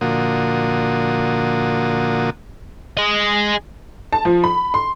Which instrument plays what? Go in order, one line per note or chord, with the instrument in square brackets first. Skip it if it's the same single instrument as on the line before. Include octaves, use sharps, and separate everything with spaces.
[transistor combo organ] A#2 D3 F3 A#3 F#4 D#6
[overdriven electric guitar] G#4 D#5
[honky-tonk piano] A5
F3
B5
C6